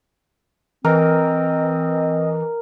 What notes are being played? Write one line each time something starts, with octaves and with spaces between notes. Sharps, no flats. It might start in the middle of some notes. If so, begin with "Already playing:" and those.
E3 C4 A#4 D#5